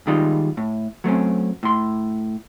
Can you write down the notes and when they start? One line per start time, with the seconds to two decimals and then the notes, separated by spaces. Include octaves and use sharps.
0.07 D#3 G3 G#3 D#4 F4
0.57 A2
1.04 F#3 A3 C4 C#4
1.63 A2 C6